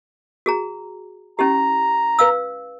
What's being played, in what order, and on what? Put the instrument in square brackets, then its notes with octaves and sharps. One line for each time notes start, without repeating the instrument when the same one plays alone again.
[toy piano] F#4 G#4 A#5
[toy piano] C#4 E4 G4 [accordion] A#5
[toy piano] B4 F5 E6